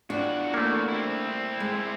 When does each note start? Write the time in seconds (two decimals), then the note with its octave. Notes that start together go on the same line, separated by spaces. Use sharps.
0.10 E2 D4 F4 F#4 G5
0.54 A3 A#3
0.88 C4 E4
1.60 G#3